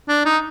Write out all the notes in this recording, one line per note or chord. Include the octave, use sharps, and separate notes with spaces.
D4
D#4